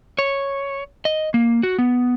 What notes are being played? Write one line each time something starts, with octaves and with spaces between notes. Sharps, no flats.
C#5
D#5
A#3
F#4
B3